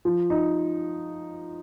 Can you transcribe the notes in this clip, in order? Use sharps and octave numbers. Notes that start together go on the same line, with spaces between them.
F3
D#4